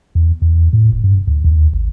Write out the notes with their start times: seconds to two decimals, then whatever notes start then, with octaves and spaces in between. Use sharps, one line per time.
0.15 E2
0.42 E2
0.73 A2
0.92 F1
1.04 G2
1.27 D2
1.44 D#2
1.73 G#1